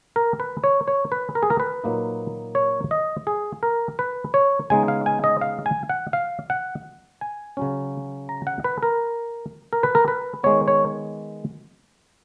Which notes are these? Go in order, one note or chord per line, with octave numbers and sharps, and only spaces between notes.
A#4
B4
C#5
C#5
B4
A#4
G#4
A#4
B4
A#2 F#3 A#3 D#4
C#5
D#5
G#4
A#4
B4
C#5
C#3 G#3 B3 D#4 G#5
F5
G#5
D#5
F5
G#5
F#5
F5
F#5
G#5
C#3 F#3 C#4
A#5
F#5
B4
A#4
A#4
B4
A#4
B4
D#3 G#3 B3 C#5
C#5